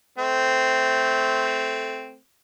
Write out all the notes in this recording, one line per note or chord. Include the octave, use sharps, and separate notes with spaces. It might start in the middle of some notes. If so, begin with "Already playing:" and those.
A3 C4